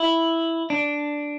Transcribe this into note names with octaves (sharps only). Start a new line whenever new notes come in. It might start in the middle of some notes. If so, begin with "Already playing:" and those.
Already playing: E4
D4